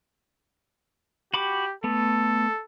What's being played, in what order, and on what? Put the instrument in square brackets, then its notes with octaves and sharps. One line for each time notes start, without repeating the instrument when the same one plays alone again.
[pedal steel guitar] F#4 B5 D6 [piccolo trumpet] G4
[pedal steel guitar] A3 B3 [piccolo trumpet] A4